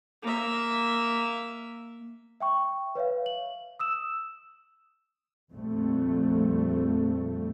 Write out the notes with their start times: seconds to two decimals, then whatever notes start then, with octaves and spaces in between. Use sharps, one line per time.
0.22 A#3 E5
2.40 E5 G5 C#6
2.95 B4 C#5 E5 F5
3.26 F#7
3.79 D#6 E6 E7
5.51 A#1 F2 G3 A3